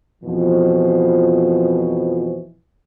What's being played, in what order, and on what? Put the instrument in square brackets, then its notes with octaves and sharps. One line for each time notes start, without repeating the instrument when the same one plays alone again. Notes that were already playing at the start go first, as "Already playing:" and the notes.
[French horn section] F2 B2 E3 F3